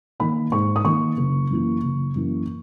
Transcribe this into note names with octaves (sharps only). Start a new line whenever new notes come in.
D#3 A#3 D#4 B5
G#2 C#6
D#6
D#3 A#3 D#4 C#6
F#1
F#2 E3 A#3
F#1
F#2 E3 A#3